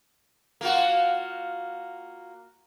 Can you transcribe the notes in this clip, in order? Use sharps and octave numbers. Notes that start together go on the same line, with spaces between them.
A#3 F4 F#4